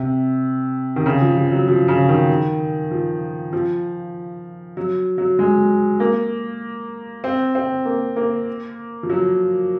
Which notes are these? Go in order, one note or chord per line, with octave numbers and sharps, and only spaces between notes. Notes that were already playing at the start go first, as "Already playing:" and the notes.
Already playing: C3
D#3
C#3
F3
F3
F#3
F3
C#3
D#3
F3
F3
F#3
F#3
G#3
A#3
C4
C4
A#3
A#3
F3
F#3